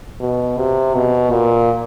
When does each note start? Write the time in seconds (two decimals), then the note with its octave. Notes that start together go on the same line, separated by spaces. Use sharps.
0.21 B2
0.58 C3
0.95 B2
1.32 A#2